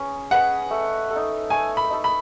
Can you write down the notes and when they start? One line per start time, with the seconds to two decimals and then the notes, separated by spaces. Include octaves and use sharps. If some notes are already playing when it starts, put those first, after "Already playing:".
Already playing: C#4 G#4 B4
0.31 G#4 B4 D#5 F#5
0.71 A3
1.10 A4
1.16 D#4
1.50 A3 G#5
1.77 B5
1.90 D#4 A4
2.04 B5